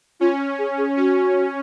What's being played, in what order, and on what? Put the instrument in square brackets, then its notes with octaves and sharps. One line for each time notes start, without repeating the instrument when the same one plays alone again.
[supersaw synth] C#4 [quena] F4
[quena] G#4
G#4
[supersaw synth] C#4 [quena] F#4